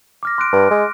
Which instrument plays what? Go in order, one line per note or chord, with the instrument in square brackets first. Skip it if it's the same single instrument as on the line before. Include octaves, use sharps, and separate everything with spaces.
[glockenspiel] D6 F6 A#6
C6 F#6 D7
[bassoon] G2
G#3